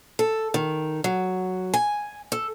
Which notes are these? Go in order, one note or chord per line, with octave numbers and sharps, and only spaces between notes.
A4
D#3
F#3
G#5
A4